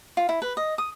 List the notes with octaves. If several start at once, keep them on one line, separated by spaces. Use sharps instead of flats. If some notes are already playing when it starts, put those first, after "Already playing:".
F4
E4
B4
D#5
D#6